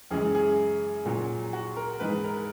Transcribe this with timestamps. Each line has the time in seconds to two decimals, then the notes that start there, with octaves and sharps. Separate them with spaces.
0.10 F#2 C#3 E3 G#3 G#4
0.35 G#4
1.05 A#2 F#3
1.53 F#4
1.76 A#4
2.00 G#2 E3 G#3 B4
2.24 A#4